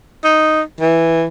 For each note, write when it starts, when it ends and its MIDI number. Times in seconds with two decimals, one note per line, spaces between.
0.24 0.61 63
0.80 1.25 52